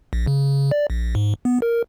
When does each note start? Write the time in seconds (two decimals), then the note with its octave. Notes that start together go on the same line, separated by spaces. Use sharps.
0.13 A#1
0.27 C#3
0.71 D5
0.90 A#1
1.15 G#2
1.45 B3
1.62 A#4